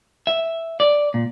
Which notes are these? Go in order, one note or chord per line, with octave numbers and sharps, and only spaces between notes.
E5
D5
A#2